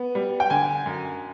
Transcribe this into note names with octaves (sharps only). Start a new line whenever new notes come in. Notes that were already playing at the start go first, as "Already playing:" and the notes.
Already playing: B3
G3
G5
D3 G#5
F#2